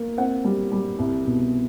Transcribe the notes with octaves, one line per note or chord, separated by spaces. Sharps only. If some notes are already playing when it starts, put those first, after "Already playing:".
Already playing: A#3
C4 F#5
G3
G3
C2
B2